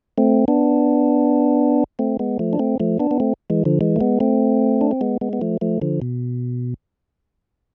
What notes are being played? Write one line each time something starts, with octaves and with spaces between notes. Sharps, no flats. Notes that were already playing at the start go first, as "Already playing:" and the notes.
A3 C4
B3 D4
A3 C4
G#3 B3
F3 A3
D4
A3 C4
F3 A3
B3 D4
B3
A3 C4
E3 G#3
D3 F3
E3 G#3
A3
G#3 B3
A3 C4
D4
C4
G#3 B3
G#3 B3
B3
F3 A3
F3 A3
D3 F3
B2